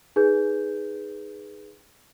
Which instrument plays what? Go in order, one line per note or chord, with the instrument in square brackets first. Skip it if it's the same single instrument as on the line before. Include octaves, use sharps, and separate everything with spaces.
[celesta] D#4 G#4 B4 G6